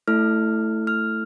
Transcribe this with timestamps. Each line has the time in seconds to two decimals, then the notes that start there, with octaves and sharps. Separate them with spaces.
0.08 A3 E4 A4 F6
0.87 F6